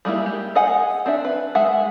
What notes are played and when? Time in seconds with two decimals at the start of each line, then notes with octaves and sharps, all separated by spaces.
0.05 G3 G#3 A#3 E4
0.26 G4
0.55 G#4 D#5 F#5 G#5
1.06 C4 D4 E5
1.25 B4
1.55 G#3 E5 F#5